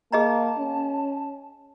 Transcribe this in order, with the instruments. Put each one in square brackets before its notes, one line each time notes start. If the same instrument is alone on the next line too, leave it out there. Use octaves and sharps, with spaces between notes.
[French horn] A#3 [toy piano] G#4 D#5 A#5 [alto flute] A5
[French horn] C#4